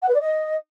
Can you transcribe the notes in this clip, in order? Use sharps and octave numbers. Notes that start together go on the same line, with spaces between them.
F#5
B4
D5
D#5